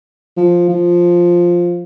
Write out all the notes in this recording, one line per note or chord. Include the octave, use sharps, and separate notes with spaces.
F3
F3